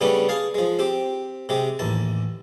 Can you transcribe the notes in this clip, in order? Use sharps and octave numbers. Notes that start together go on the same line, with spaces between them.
C#3 G3 A3 B3 C#4 D4
G#4 F5 A5
F3 G#3
C4 G4
C3 G#3 G4
A1 D#2 A5